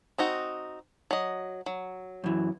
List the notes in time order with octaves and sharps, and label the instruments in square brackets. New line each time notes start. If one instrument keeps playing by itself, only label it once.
[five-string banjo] C4 D#4 F#4
F#3 D#5
F#3
[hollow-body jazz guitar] F#2 E3